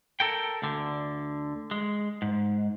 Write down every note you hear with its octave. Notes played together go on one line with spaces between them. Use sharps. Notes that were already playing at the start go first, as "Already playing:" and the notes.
A4 A#4 G5
D2 D3
G#3
G#2